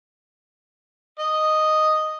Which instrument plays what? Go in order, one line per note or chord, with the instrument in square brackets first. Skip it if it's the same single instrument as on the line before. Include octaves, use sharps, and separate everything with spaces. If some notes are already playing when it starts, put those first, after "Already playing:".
[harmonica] D#5